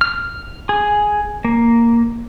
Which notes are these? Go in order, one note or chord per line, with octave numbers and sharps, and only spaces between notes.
F6
G#4
A#3